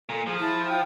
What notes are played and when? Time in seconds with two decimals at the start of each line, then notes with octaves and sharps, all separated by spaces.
0.09 A#2 A4
0.27 F3 G#4
0.39 E4 A5
0.69 F5 G5 E6